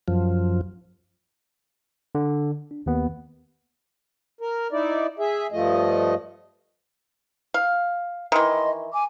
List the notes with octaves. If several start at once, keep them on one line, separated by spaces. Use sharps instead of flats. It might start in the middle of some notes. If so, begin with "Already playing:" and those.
F#2 F3
D3
D4
D#2 B3
A#4
D#4 E4 D5
G#4 E5
G2 F3 A3 D#5
F5
D#3 E3 D#5 C6
G#5 D6